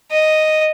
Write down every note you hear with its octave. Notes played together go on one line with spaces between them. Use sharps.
D#5